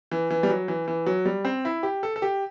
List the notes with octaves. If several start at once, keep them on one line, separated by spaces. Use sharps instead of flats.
E3
E3
G3
F#3
E3
E3
F#3
G3
C4
E4
G4
A4
A4
G4